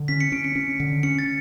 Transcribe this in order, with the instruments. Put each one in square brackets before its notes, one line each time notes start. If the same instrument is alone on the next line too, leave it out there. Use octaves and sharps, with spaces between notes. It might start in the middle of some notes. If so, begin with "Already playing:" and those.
Already playing: [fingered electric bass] D3
[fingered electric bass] C#4 [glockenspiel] B6
[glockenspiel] C#7
[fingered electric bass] C#4 [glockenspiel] D7
[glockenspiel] C#7
[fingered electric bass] C#4
D3
[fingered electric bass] C#4 [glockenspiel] C#7
[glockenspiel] A6